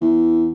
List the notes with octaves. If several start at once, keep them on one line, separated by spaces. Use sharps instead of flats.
E2